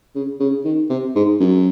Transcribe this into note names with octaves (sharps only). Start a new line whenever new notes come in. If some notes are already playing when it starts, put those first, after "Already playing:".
C#3
C#3
D#3
C3
G#2
F#2